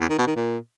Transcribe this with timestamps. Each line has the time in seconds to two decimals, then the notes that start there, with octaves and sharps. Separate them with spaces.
0.01 E2
0.10 D#3
0.18 B2
0.27 D#3
0.36 A#2